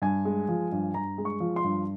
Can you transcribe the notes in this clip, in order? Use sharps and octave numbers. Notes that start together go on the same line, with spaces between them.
G2 G#5
G#3
F3
G2
G2 A#5
G#3
C#6
F3
C6
G2